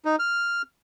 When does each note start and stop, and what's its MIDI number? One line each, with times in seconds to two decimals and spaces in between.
0.05 0.16 63
0.19 0.62 89